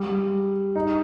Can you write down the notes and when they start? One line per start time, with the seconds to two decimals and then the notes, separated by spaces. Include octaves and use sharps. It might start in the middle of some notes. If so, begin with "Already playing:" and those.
Already playing: G3
0.76 D#4